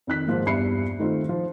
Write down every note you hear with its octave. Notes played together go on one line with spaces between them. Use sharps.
F2 D#3 F#6 B6
G#2 F3 A#3
E2 G2 E5 B5 C7 C#7
D#3 A3 C4 D#4 F4
F3